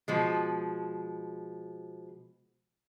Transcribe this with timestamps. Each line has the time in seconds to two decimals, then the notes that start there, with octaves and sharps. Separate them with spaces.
0.08 B2 F3 G#3